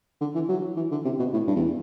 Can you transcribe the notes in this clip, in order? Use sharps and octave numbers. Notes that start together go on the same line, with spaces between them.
D3
E3
F#3
E3
D3
C3
B2
A2
G2
E2